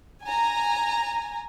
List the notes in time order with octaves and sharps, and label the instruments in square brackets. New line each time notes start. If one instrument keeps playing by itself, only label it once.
[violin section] G#5 A#5